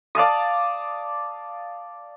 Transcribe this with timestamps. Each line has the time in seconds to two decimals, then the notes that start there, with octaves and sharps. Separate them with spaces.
0.15 D5 F5 A5 D#6